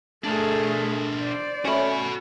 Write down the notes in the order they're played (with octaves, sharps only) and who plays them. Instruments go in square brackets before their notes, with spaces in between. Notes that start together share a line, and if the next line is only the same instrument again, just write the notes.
[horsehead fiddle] A3 G#4 [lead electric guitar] D4 A#4
[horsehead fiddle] C5 D5
[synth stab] A3 C#4 [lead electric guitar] F#4 B5